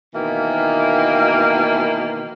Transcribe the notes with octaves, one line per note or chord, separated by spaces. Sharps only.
B2 D#3 E3 A#3